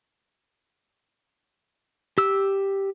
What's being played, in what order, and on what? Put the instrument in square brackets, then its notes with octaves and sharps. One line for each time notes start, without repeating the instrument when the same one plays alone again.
[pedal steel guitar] G4 E6